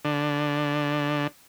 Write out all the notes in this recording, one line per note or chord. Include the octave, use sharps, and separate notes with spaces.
D3